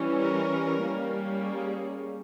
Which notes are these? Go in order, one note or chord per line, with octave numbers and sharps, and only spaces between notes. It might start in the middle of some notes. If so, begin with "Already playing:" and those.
Already playing: E3 G3 C#4
A#4
G3 A#3 C#4
G#4